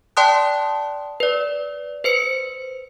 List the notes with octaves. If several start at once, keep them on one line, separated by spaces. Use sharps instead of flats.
D5 G5 A5 C6 D#6 F#6
B4 D5
B4 C5 C#7